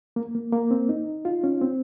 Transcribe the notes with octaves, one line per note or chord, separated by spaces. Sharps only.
A#3
A#3
A#3
C4
D#4
F4
C#4
C4